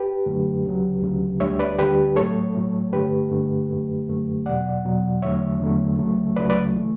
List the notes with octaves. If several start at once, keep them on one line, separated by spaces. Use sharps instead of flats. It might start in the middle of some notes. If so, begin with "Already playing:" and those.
Already playing: G4 B4
F#2 D3 F#3 A3
D2 C#3 F#3
D2 C#3 F#3
D2 D3 G3 C#5 E5
B4 D5
D2 D3 G3 G4 B4
A2 F#3 A3 A4 C#5
A2 F#3 A3
G2 D3 A3 G4 B4
G2 D3 A3
F#2 D3 A3
F#2 D3 A3
E2 B2 F#3 D5 F#5
E2 B2 F#3
E2 D3 F#3 A3 C#5 E5
E2 D3 F#3 A3
C#2 C#3 F#3 A3
C#2 C#3 F#3 A3 B4 D5
B4 D5
E3 A3